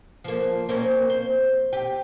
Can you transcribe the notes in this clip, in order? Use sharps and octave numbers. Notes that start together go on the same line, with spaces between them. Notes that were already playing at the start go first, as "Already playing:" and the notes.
F3 A#3
A#3 C4 C#4
C5
G4